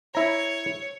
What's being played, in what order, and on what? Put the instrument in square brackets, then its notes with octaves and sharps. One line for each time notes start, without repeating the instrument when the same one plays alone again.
[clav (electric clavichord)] E4 A#5 [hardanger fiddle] C#5